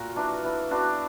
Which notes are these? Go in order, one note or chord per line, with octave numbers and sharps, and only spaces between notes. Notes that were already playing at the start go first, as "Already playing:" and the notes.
Already playing: A#2 F#4 A#4
E3 D4
E3
B3 D4 F#4